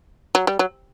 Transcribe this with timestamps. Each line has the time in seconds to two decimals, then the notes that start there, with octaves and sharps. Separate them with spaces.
0.35 F#3
0.47 G3
0.59 F#3